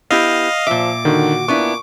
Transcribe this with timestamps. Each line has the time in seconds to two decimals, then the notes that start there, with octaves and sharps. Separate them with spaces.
0.11 B3 E4 G4 D#5 F5
0.67 A#2 F3 E5 D6
1.05 D3 D#3 F#4
1.48 A#2 B3 D4 E4 C#6